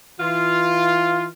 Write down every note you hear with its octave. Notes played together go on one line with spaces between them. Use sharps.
E3 F4